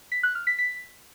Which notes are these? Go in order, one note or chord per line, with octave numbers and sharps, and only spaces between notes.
B6
F#6
F6
B6
B6